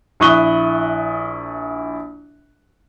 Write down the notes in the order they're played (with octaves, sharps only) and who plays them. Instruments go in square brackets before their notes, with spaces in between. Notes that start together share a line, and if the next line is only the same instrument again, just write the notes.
[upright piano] A#1 E4 C#6 D#6 F#6 G7